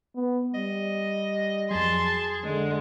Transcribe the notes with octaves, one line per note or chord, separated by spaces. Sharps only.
B3
G3 D#5
F2 F#3 G#4 A5 C6
D3 G#3